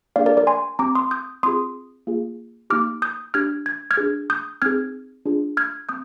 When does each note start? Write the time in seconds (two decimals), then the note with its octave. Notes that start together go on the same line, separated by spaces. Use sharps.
0.16 A#3 D4 G#4 D5 F5
0.26 A#4 D5
0.37 A#4 D5
0.47 G#5 C6
0.79 C4 G4 A#5 D6
0.95 C6 D#6
1.11 D#6 G6
1.43 C4 F4 G#4 C6 D#6
2.07 A#3 F4 G#4
2.70 A#3 D#4 G4 D6 F6
3.02 D#6 G6
3.34 D4 G4 F6 G#6
3.66 G#6
3.91 F6 G#6
3.97 D4 G#4
4.30 D#6 G6
4.62 C4 D#4 G#4 F6 G#6
5.26 D4 F4 G#4
5.57 F6 G#6
5.89 C4 D#6 G6